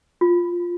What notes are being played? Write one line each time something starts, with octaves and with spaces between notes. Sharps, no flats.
F4